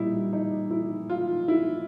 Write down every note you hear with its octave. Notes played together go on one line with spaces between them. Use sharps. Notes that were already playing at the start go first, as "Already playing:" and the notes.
Already playing: A#2 G3 D#4 E4
D#4
E4
F4
E4